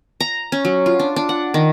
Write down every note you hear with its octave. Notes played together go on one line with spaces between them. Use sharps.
A#5
C#4
F#3
F4
D4
D4
F#5
D#3